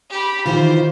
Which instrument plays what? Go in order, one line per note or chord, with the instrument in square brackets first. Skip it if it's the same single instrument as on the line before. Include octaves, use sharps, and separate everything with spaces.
[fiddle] G4 B5
[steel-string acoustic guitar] D#3 E3 F4 [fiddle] C5